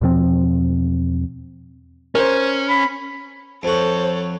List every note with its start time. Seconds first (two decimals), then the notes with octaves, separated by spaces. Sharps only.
0.01 E2 B2 F3 C4
2.15 C#4 A#4 C5
2.68 B5
3.63 F2 F#4 A4 C5 C#5